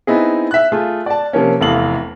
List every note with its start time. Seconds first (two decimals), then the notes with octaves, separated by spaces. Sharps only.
0.07 B3 C4 D#4 E4 G#4
0.51 E5 F#6
0.72 A3 F4 G#4
1.06 D5 A5
1.33 C3 F3 A#3 C#4
1.61 F1 E2 A4 F5 F#7